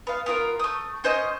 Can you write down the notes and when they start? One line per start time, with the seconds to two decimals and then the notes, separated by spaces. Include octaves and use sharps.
0.07 B3 F5
0.26 B3 F4 A#4
0.60 A3 D#6
1.04 C#4 C5 D#5